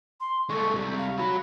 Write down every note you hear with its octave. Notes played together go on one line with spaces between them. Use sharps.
C6
G#3 A3 C#6
C2 G3
F5
F#3 F#4 B5